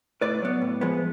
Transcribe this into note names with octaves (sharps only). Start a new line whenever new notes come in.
A2 B4 D5
F#3 B3
A2
F3 G#3 B3